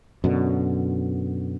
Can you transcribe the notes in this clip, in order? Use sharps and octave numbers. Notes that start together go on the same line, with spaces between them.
F#2 B2 D3